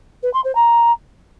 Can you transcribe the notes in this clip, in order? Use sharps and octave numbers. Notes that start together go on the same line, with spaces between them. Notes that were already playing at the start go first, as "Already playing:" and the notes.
B4
C6
C5
A#5